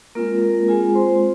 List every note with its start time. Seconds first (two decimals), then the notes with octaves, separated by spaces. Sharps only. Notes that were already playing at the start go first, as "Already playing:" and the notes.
0.15 G#3 A#3 C4 F4 A#4
0.42 A#3 A#4
0.68 G#3 C4 F4 G#4 G#5
0.95 C5 C6